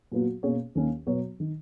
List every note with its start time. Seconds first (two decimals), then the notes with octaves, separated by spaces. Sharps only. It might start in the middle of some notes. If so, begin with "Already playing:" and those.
0.12 A#2 F#3 B3 F#4
0.43 B2 A#3 C#4 G#4 C#5
0.75 D#2 D#3 A#3 C#4
1.07 B2 F#3 B3 F#4 C#5
1.40 D#3